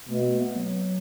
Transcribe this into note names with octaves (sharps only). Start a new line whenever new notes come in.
B2 A3
A3
B3
F#3